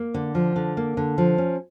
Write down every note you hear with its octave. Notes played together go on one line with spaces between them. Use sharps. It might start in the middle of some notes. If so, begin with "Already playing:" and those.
Already playing: A#3
D3
F3
D3
A#3
D3
F3
C#4